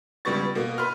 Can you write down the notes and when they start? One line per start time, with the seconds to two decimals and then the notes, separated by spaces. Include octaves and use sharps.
0.25 C#2 G3 B3 C#6 A6
0.55 B2 A#3
0.78 B4 C6 F6